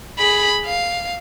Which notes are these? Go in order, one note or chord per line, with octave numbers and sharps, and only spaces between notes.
G#4 B5
F5